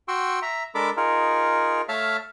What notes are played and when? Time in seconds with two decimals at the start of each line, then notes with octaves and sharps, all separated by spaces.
0.08 F#4 G5 C6 C#6 E6
0.42 E5 A#5
0.75 G#3 D4 A4 A#4 B5 D6
0.97 D#4 F4 G#4 A#4
1.89 A3 C#5 E5 F5 A5 F6